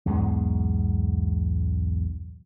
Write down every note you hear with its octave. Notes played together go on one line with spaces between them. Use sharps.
B1 E2 G#2 G#3